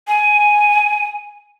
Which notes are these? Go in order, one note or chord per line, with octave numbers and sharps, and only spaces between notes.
G#5